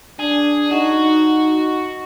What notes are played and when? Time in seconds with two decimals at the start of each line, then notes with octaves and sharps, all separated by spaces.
0.20 D4 G#4
0.72 D#4 F#4